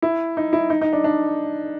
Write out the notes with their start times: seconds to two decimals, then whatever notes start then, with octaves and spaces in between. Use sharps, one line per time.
0.02 E4
0.37 D#4
0.53 E4
0.70 D#4
0.81 D#4
0.93 D4
1.04 D4